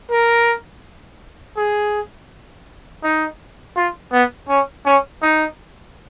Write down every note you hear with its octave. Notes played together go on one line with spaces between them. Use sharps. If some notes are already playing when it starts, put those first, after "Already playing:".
A#4
G#4
D#4
F4
B3
C#4
C#4
D#4